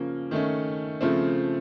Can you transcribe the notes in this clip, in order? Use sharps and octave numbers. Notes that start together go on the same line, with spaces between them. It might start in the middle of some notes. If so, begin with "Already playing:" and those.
Already playing: C#3 F3 A#3 C#4
D#3 A3 C#4
C#3 F3 A3 C4